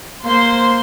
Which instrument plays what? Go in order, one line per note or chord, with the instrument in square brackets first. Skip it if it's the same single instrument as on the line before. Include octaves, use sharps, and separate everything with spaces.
[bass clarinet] A#3 [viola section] C5 C6